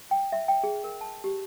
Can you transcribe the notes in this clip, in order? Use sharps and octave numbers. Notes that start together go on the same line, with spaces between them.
G5
E5
G5
G#4
A#4
A5
G4